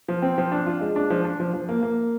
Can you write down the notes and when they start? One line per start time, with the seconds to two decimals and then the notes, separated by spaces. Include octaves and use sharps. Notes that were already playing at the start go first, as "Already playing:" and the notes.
0.08 F3
0.22 C4
0.38 F3
0.52 D4
0.66 F4
0.81 G#3
0.96 D4
1.10 F3
1.25 D4
1.40 F3
1.54 F3
1.69 A#3
1.83 A#3